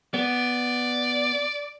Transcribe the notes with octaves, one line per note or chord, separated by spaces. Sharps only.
B3 D5